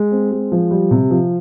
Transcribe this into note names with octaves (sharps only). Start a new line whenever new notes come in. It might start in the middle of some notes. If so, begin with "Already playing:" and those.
Already playing: G#3
C4
G#3
F3
G3
C3
F3